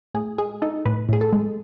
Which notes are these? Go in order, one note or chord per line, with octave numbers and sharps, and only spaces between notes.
A2 G#4
G#3 G#4
D#4 A4
A2 B4
A2 G#4
A4
G#3